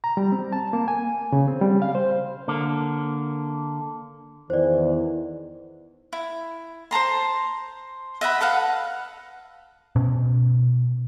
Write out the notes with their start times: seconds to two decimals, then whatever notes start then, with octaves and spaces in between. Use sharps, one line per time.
0.04 A#5
0.17 G3
0.32 C4
0.52 A5
0.73 A#3
0.88 G#5
1.32 C#3
1.48 C4
1.61 G3
1.82 F5
1.95 C5
2.48 D3 A#3
4.50 E2 D#3 E3 C5 D5
6.13 E4
6.91 C5 A5 A#5 C6
8.21 D#5 E5 F#5 B5
8.41 A4 B4 F5 F#5
9.96 B2 C#4